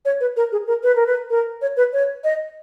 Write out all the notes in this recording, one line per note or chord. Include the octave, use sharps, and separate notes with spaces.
C#5
B4
A#4
G#4
A#4
B4
A#4
B4
A#4
C#5
B4
C#5
D#5